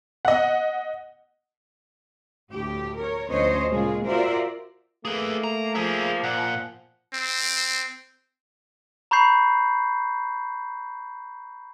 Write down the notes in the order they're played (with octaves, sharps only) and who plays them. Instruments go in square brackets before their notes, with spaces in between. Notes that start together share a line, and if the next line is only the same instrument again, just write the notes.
[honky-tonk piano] D#5 F#5
[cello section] D2 A2 G4
A#4 C#5
D2 F3 C#4 C5 C#5 D#5
A#2 C#3 G#3 A#3 F4 G#4
F4 F#4 A#4 C5 D5 E5
[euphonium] A3 [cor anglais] A#3 [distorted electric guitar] G#4 B4
[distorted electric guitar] A#5
[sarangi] F3 [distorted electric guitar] G#4 E5
[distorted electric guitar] A#2 [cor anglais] F#5
[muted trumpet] C4
[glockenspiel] A#5 B5 C#6 G6 C7